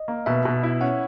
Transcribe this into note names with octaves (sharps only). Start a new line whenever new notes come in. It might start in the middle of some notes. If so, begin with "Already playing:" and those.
Already playing: D#5
A#3
B2 E5
B2
E4
C#4 F#5